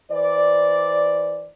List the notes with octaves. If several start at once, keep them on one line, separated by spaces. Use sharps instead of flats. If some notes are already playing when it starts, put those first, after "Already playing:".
E3 C5 D5